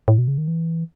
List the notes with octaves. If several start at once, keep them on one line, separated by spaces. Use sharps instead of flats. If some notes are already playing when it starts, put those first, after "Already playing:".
A2
B2
C#3
D#3
E3